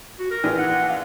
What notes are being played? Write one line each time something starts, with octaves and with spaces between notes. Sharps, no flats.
F#4
A#4
A#1 E3
F#5
F5